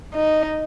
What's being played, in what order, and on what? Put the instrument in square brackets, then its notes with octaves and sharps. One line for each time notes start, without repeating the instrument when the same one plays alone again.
[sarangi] D#4